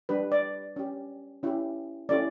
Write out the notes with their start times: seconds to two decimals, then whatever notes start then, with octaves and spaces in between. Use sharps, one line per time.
0.09 G3 D4 G4 B4
0.32 D5
0.76 C#4 G4
1.43 C#4 E4 G4
2.09 A3 C#4 E4 G4 D5